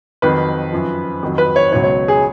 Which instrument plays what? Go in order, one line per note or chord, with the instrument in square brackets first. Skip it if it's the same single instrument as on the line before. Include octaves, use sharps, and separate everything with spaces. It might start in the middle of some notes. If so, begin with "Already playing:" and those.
[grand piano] F2 D#3 F#3 B4
F#2 F3
F2 D#3 F#3
B4
C#5
C#2 B2 F#3 C#5
C#5
G#4